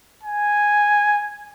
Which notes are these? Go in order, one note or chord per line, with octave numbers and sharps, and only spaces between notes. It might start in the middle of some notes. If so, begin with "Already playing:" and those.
G#5